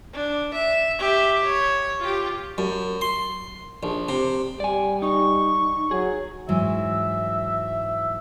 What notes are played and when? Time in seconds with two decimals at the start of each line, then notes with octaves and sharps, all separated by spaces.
0.14 D4
0.53 E5
0.99 G4 E5
1.45 C#5
2.00 F4 G4
2.58 F#2
3.01 C6
3.83 A#1
4.09 C3
4.60 G3 D5 G#5
5.02 D#4 C#6
5.91 F#3 G#4
6.49 G#2 E3 F#3 E5